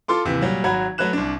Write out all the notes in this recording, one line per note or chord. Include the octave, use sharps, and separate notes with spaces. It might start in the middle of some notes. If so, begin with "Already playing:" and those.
F4 A4 C6 D6
D#2 C3 E3
A#2 F#3 G3
G#1 F#3 F#4 A#5 B5 G#6
F#3 A3 B4 F#6 E7
C2 D4